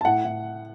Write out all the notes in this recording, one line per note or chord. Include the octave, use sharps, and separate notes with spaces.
A5
A2 F#5
A2